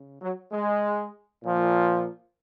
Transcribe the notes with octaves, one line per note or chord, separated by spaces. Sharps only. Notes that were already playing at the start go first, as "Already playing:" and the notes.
Already playing: C#3
F#3
G#3
A#2 F3